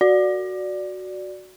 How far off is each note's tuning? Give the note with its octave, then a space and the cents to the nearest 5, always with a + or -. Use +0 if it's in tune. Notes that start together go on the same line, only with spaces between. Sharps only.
F#4 +0 D5 +0